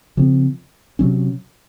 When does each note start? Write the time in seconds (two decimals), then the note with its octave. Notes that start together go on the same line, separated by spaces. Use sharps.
0.17 C#3 F3 C4
0.99 C3 F#3 C#4